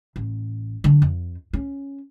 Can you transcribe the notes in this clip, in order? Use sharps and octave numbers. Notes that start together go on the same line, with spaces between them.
A1
D3 F#3
F2
C#4